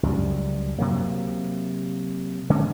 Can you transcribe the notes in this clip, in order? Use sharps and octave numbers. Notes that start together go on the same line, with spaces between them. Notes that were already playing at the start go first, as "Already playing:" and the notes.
C#2 F#2 G3
C3 F#3 A#3
D3 G#3 C#4